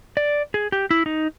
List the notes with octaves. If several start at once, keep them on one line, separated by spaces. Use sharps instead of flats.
D5
G#4
G4
E4
D#4